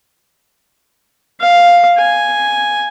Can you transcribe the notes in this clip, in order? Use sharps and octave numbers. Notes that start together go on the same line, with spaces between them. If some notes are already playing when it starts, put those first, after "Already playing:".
F5
G#5